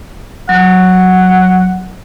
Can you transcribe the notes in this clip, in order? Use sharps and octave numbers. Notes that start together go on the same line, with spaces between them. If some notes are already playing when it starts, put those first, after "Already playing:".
F#3 F#5